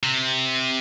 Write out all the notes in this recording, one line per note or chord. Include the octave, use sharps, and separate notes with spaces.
C3